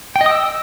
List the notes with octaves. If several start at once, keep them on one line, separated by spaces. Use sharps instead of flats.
G5
D#5
D#6
E6